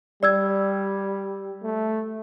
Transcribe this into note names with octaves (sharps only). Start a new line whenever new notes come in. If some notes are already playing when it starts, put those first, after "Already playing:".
G3 D5 E6 G#6
A3